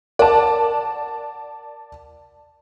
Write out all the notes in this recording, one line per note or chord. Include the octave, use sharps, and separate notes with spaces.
A#4 D5 F#5 A5